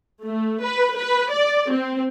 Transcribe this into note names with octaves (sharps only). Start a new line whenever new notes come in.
A3
B4
B4
D5
C4